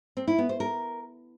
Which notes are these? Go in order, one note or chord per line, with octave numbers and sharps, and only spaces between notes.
C4
E4
B3
C5
A#4